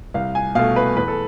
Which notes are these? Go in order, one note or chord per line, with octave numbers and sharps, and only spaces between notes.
C2 F5
G#5
B2 A3 F5
B4
E2 B4
A4